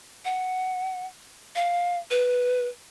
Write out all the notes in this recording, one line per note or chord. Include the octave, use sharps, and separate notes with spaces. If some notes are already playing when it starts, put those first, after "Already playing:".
F#5
F5
B4